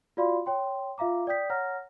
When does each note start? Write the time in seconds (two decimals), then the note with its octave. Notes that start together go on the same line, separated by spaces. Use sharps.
0.17 F4 F#4 D5 F5 B5 C6
0.46 C#5 G5 C6
0.98 F4 E5 F5 A#5 D6
1.27 D5 G5 D#6 G6 B6
1.50 C#5 F#5 A#5 F6 A#6